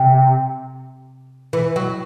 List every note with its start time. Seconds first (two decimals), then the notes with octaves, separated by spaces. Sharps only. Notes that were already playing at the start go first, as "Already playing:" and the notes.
Already playing: C3
1.53 E3
1.76 F#3